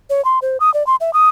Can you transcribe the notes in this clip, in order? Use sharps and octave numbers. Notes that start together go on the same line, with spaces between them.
C#5
C6
C5
D#6
D5
C6
E5
D#6